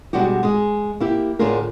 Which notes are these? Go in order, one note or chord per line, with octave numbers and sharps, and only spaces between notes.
B2 G3 G#3 D4 F#4 G4
G#3 G#4
A#3 E4 G4
A2 D3 D4 F4 G#4 A#4